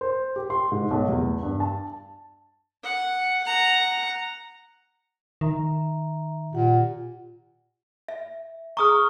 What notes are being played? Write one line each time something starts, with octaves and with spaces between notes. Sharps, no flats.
C5
G4
C6
G#2
B1
E2
G2
A5
F#5
F#5 A#5
D#3 E5 A#5
A#2 G4 F#5
E5
G#4 A#5 C#6 D#6 F6